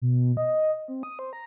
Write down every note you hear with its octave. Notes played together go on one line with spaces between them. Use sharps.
B2
D#5
C4
D#6
C5
A#5